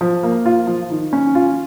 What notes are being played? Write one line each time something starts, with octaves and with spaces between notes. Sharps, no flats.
F3
A#3
F4
F3
D#3
C#4
F4